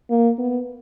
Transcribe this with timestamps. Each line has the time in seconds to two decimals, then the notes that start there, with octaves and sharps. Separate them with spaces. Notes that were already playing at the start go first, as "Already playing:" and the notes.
0.10 A#3
0.38 B3